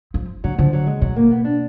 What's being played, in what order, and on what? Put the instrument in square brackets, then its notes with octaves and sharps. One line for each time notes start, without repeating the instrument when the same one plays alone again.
[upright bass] F3
[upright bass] D3 [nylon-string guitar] F#3
[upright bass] D3 [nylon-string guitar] F3
[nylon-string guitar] F#3
G#3
[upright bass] B2 [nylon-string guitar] F#3
[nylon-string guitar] A#3
B3
D4